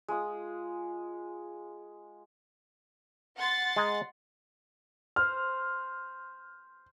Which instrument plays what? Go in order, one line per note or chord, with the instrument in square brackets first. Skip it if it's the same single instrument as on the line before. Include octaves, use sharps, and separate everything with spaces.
[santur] G#3 F4 D#6
[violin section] F#5 C6 A6
[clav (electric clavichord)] G#3 G#5 A#5
[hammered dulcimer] C5 [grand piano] F6